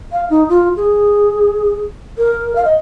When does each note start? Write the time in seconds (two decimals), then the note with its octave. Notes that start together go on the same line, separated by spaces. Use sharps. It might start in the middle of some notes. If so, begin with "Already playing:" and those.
0.12 F5
0.30 D#4
0.49 F4
0.76 G#4
2.18 A#4
2.55 F5
2.65 D#5